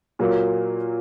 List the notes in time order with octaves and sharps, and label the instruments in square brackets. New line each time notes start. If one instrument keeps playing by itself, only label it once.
[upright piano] A#2 F#3 A#3